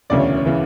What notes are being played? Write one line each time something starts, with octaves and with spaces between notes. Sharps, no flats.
E1 D2 C#3 E3 D5
C#5
C#5
C#3 E3